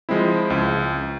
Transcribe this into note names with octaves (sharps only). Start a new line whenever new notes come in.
F3 G#3 C4 E4
C#2